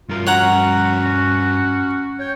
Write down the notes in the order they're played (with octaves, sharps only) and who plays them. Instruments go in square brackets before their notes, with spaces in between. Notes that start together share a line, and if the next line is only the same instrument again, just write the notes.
[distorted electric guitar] G2 A#4 [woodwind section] F4
[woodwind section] C#4 F#4 [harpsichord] C#5 F#5 A#5
[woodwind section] C#5 G5